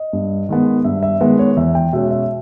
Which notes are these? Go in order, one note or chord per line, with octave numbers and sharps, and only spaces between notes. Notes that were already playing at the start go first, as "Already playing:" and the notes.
Already playing: D#5
G2
D#3 G#3 B3
G2 E5
E5
D#3 G#3 B3 B4
C#5
E2 E5
G5
B2 G#3 C#4 E5
E5